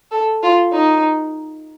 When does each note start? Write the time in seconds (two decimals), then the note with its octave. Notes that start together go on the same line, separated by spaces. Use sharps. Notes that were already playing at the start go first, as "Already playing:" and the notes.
0.11 A4
0.43 F4
0.72 D#4